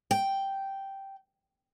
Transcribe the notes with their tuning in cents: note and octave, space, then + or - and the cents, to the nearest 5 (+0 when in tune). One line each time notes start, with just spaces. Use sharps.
G5 -5